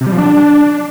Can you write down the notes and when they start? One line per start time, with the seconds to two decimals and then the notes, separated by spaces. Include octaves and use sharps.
0.01 C3
0.06 G3
0.12 F3
0.18 D4